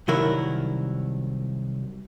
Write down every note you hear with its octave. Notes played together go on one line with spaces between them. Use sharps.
C2 D#3 F#3 E4 A#4